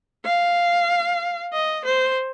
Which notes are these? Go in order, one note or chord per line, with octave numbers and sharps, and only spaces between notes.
F5
D#5
C5